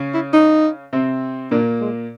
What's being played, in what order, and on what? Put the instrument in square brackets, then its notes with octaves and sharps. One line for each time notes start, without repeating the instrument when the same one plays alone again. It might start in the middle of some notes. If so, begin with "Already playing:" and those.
Already playing: [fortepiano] C#3 C#4
[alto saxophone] E4
D#4
[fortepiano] C3 C4
[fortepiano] A#2 A#3 [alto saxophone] D4
[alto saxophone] G#3